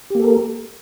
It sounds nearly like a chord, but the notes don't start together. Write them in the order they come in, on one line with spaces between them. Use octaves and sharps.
G4 A#3 A4 A#4